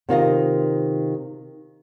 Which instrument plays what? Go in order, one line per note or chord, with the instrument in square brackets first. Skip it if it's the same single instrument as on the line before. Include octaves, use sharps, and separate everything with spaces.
[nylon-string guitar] C3 D#3 F4 D#5